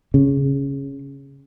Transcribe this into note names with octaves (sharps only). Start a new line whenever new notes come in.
C#3